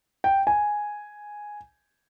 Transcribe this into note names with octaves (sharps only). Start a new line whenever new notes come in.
G5
G#5